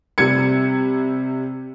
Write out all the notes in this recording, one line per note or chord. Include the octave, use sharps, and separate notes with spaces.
C3 G3 G#6 C#7